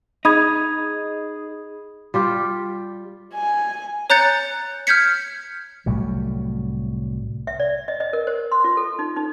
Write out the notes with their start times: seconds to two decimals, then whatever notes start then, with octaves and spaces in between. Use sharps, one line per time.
0.25 D#4 G#4 B5 D#6 G#6
2.14 G3 F4 G4
3.35 G#5
4.10 C#5 A#5 F#6 G6 A6 C#7
4.87 F6 G6 G#6 B6 C#7
5.86 C2 A2 F#3 G3
7.47 E5
7.60 D5
7.88 D#5
8.00 D#5
8.13 A#4
8.27 C5
8.52 C6
8.64 F4
8.77 A4
8.99 D#4
9.16 D#4